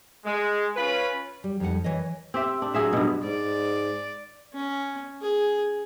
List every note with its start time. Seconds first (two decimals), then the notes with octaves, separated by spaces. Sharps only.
0.25 G#3
0.76 C#4 F4 B4 B5
1.44 G3
1.60 F2 G3 D#4 F#5
1.84 E3 C#5 D#5
2.34 C4 G4 E5
2.62 D4
2.74 F#3 G#4 E5 F5
2.93 G2 B2
3.24 G#2 D5
4.54 C#4
5.22 G#4